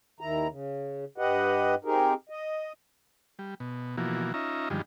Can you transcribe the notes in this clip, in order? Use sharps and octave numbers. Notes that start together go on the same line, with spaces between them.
D#2 D#3 E4 A#5
C#3
G2 G4 B4 D#5 F#5
C4 D#4 G4 G#4 A#4
D#5
G3
B2
B2 E3 F3 A#3 F#4
C#4 D#4 F4 E5 A#5
G2 D3 D#3 F3 G3 G#3